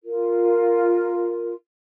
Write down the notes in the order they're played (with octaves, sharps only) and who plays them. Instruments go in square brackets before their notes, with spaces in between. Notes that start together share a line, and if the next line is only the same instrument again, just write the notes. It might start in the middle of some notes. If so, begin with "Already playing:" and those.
[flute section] F4 A#4